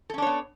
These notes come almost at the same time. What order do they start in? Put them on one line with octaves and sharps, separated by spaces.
A4 C#4 D4 C#5 B3